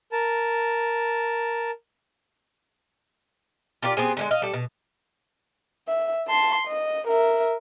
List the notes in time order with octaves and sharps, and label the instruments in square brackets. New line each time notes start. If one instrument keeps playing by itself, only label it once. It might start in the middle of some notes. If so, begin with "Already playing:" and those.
[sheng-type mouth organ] A#4 A5
[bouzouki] F4 G4 A#4 D5
B3 C4 G#4
D3 F3 G#3
D#5 F5
G3 A4
B2
[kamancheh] E5
A5 C6
D#5
A#4 E5